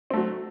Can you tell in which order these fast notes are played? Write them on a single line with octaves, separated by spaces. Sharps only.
C4 A3 F#3